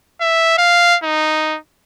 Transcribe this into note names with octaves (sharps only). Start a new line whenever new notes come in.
E5
F5
D#4